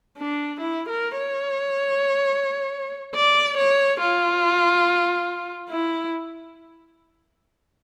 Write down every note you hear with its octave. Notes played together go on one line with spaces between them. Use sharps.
D4
E4
A#4
C#5
D5
C#5
F4
E4